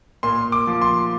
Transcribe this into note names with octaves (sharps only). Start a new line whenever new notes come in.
A#2 C6
D6
F3
C6